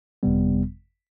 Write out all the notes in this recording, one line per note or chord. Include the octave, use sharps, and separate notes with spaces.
G1 F2 C3 G3 B3